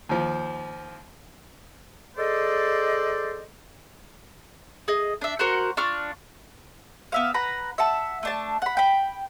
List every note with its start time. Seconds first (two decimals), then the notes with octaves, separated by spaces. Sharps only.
0.09 D#2 F3
2.17 G#4 A4 C5 D5 D#5
4.88 G#4 D#5
5.21 D4 E5
5.39 F#4 A#4 C5 F#5
5.77 D4 F4 C#6 F6
7.12 B3 E5 F5
7.34 B4 F#5 A#5 B5
7.78 E5 F#5 A5
8.23 A3 D4 A5
8.62 F#5 B5
8.77 G5 B5